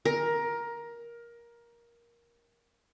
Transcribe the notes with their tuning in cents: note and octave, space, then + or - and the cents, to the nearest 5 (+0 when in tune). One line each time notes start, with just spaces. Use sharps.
A#4 +15